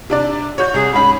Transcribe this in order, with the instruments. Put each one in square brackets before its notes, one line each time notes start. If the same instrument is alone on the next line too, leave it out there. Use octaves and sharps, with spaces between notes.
[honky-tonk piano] C3 D4 D5
[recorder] F#4 [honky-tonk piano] C#5 G6
[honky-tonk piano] C2 C3 [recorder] G#4
[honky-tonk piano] G#2 C#4 [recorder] B5